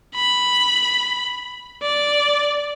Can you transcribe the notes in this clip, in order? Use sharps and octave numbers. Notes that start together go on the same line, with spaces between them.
B5
D5